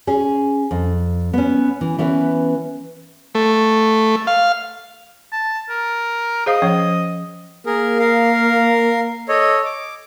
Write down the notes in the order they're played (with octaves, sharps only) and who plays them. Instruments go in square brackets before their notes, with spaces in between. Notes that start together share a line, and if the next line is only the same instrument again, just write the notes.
[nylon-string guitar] C#4 G#4
F2
B3 C#4
E3
E3 B3 C#4 B4 C#5
[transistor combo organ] A3
F5
[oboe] A5
A#4
[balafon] G#4 C5 F5 [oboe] D#5
[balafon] F3 C#4 C#5
[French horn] A#3 [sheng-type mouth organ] G#4 A#4
[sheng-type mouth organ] A#4 F5
A4 C#5 D#5
D6